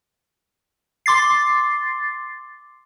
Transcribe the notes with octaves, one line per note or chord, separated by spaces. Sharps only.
C6 D6 A6 C7